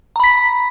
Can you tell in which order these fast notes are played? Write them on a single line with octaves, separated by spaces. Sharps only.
A#5 B5 B6